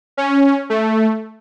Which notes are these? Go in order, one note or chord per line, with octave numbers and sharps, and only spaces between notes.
C#4
A3